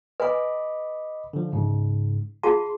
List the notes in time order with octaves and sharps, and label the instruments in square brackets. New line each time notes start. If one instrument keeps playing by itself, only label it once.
[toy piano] B4 G#5 [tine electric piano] D#5 B5 D6
[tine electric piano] D3 F3
G#2 C#3
[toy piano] F4 G#4 A5 [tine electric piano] C6